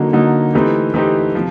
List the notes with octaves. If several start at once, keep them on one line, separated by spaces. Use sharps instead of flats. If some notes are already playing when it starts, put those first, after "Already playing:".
Already playing: D3 F#3 A#3 D#4
D3 F#3 A#3 D#4
E3 A3 C4 D#4 G4
E3 A3 C4 D#4 G4
C3 F3